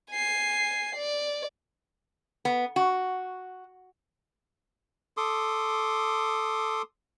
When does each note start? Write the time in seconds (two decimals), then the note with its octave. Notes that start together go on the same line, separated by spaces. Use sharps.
0.11 G#5 C7
0.96 D5
2.45 B3
2.76 F#4
5.17 A4 C6 D6 D#6